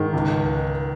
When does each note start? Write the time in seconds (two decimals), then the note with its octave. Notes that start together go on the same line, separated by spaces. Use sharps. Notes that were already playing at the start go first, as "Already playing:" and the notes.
Already playing: G#2 D#3
0.13 C#2